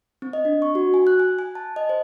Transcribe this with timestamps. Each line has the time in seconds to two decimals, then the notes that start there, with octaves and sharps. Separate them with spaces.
0.22 C4
0.33 D#5
0.45 D4
0.62 C#6
0.75 F#4
0.94 G#5
1.07 F#6
1.20 G#5
1.39 G#5
1.55 A5
1.76 D#5
1.89 C5